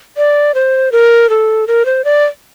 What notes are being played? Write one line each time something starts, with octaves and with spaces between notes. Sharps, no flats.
D5
C5
A#4
A4
A#4
C5
D5